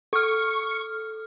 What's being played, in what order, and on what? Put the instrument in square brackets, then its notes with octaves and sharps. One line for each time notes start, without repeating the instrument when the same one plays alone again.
[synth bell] A4 F6 [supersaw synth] C#6